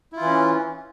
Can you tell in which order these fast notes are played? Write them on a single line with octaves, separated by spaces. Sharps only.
E4 F4 E3 C#4